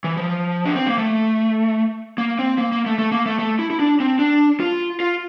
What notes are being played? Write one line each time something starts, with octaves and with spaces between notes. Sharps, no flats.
E3
F3
D4
C4
A#3
A3
A#3
C4
A#3
A#3
A3
A3
A#3
A3
A3
E4
E4
D4
C4
D4
F4
F4